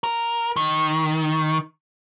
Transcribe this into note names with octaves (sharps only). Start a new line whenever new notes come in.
A#4
D#3